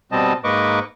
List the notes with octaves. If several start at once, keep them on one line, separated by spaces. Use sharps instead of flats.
B2 G3 C4 D#5 A5
G#2 A#3 B4 D#5 C#6 D6